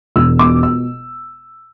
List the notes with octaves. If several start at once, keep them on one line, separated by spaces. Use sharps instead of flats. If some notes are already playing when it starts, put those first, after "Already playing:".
E1 E6
B2 D6
E6